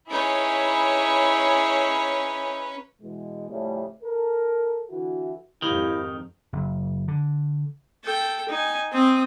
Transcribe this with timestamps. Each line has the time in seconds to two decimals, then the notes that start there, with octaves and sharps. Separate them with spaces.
0.10 C#4 D#4 E4 G#4 B4 C#5
3.01 B2 E3 G#3
3.49 A2 C#3 F3 G3 A3
4.02 A4 A#4
4.90 D3 E3 E4 F#4
5.62 F2 G#2 D#3 E4 G4 A#4 F5
6.53 F#1
7.08 D3
8.04 A4 G5
8.49 D#4 G#5
8.93 C4 D#6